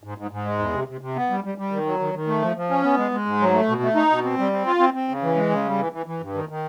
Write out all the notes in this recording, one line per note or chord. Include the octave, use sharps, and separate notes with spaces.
G#2
G#2
G#2
G#3
E2
C3
C3
C3
B3
G3
G3
G3
D#3
F#3
D#3
D#3
A3
F3
F3
C#4
B3
G#3
G#3
G#2
F#3
A3
B2
A3
D#4
B2
C4
G3
C4
F4
C4
C4
C#3
E3
G#3
C#3
G3
E3
E3
E3
G2
D#3
D#3